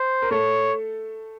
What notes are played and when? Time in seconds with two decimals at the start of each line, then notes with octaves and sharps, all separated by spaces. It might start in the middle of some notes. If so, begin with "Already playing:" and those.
Already playing: C5
0.22 A#4
0.31 A3 A4 C#5